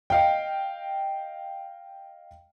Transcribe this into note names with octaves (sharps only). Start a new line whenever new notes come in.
D#5 F5 G5